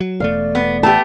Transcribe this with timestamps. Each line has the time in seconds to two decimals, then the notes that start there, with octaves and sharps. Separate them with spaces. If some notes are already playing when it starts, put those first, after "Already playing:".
0.01 F#3
0.20 E1 E2 A3 D5 F5
0.55 B3
0.83 A1 A3 B3 G4 A5